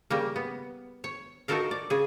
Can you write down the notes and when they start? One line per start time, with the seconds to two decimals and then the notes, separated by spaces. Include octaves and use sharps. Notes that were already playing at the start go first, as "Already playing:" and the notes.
0.10 C#3 G3 A#3
0.36 B3
1.04 C#5
1.48 D#4 F4 F#4 A4 A#4 F5
1.71 D5
1.90 C#3 G#4